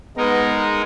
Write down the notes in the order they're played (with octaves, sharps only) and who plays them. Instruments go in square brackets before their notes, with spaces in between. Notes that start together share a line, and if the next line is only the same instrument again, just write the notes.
[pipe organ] G#3 D#4 A#4 [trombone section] B3